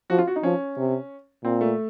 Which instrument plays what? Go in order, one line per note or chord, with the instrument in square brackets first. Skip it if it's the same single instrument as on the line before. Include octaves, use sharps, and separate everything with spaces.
[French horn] F3 [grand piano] F#4
[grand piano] F4
F#4
D#4
[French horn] F3 [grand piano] C#4
[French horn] C3
[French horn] A#2 [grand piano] C4
[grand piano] A3